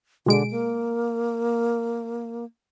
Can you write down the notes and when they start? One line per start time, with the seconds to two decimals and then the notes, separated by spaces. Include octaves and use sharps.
0.26 B2 D3 G#3 D7
0.51 A#3